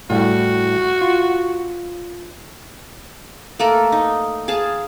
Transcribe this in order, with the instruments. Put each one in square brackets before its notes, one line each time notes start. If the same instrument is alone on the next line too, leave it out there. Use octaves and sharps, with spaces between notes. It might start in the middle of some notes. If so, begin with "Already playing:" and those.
[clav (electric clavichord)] A2 G3 E4 [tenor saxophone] F#4
[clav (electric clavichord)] F4
[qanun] A3 A#3 A4 A#4
D#4
G#4 F5 A5